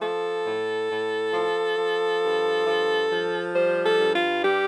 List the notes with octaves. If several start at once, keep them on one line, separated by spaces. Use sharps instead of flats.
F3 A4
A2
A2
F3
F3
G2
F3
F3
G3 C5
A4
G2
F4
G3 G4